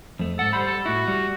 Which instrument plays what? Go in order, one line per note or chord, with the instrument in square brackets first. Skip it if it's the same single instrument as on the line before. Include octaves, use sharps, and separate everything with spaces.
[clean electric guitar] F2 A3
[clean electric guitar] G#2 F#5 [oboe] A4
[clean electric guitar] G3 F#5 B5 [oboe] C5
[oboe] A4
[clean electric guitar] A2 E4 [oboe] F#4
[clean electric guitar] G3